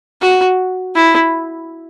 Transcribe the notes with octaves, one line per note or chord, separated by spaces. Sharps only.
F#4
E4